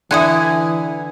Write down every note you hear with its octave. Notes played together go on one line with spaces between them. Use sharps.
D3 E3 E4 F4 G#5 D#6 F#6